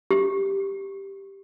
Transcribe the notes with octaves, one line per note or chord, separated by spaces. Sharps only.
G4